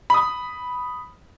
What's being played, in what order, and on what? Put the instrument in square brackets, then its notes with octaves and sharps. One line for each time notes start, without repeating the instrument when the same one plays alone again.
[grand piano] B5 D#6